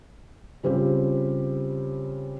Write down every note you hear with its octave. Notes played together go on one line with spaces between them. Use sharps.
C#3 G3 C4 F4 G4 C5